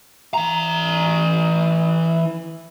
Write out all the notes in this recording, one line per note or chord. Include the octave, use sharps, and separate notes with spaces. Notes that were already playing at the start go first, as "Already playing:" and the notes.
E3 A#5